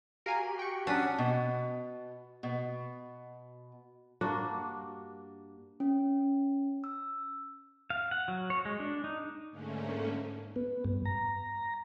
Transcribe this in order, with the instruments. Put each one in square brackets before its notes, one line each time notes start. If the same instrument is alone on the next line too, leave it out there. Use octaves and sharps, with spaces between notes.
[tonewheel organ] F#4 G4 [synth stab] A#4 F5 G#5
[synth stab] G5 C#6
[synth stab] F#3 D#6 B6 [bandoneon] C#4 F#5 [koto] D4
[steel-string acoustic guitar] B2
B2
[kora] G2 A#3 D4 F#4
[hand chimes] C#4
E6
[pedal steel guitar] F5
F#5
F#3
C#5
G#3
D4
D#4
[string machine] G#2 D3 A3 A#3 C#4
[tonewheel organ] B3
G2
A#5